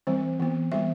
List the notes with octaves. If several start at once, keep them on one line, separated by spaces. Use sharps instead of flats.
E3 G3 C4 C5
E3 B3
E3 G3 B3 E5